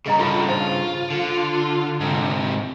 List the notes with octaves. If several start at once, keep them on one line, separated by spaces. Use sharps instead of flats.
G2 C#3 G#4 D#5 A#5
C#4 F4 A4 A5 B5
F4 C5 A5
D3
G#2 C3